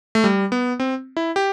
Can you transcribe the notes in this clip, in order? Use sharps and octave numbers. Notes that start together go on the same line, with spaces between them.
A3
G3
B3
C4
E4
G4